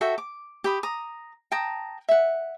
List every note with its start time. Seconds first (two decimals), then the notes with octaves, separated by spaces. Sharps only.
0.01 F#4 A4 E5 G5
0.18 D6
0.64 G4 B5 D#6
0.83 A#5 D#6
1.52 G5 A5 A#5 D#6
2.09 E5 F#5